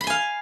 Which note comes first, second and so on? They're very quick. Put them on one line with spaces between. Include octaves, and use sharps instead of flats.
B5 C6 G#5 F5